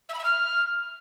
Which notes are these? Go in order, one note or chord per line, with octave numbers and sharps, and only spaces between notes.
E5
B5
E5
F6